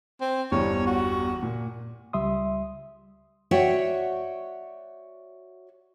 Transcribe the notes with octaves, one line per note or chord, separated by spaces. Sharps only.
C4
G1 E2 G3 C#5
F#4
A#2
C#2 G3 E5 C6 D#6
F#4 C#5 D5 E5 F#5 G5